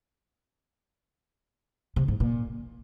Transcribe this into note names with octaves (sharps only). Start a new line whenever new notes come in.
C3
G#2
A#2